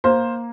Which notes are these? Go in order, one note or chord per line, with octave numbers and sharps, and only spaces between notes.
A#3 C5